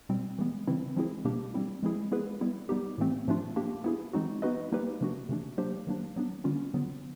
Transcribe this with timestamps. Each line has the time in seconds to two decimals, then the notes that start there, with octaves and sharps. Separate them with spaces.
0.09 B2 G3 C4
0.39 E3 G#3 B3
0.67 C#3 E3 G3 C4 E4
0.96 F3 G#3 C4 E4 G#4
1.25 B2 G3 A#3 D4 G4
1.54 G3 C4 E4
1.83 F3 G#3 C4 E4 G#4
2.12 G#3 B3 E4 G#4 B4
2.41 G3 B3 E4
2.69 G3 B3 D#4 G4
2.98 A2 E3 A3 C4
3.27 A2 F3 A3 D4 F4
3.56 A#3 D4 G4
3.84 B3 E4 G#4
4.13 E3 G#3 C4 D#4 F#4
4.42 B3 D#4 F#4 B4 D#5
4.72 G3 A#3 D#4 G4 B4
5.01 C3 F3 A3 D4 F#4
5.29 C3 E3 A3 D4
5.58 F#3 A#3 D4 G4 C5
5.87 D#3 F#3 A#3 D4
6.16 F#3 B3 D4
6.44 D3 G3 A#3 C#4 F4
6.74 D3 F#3 B3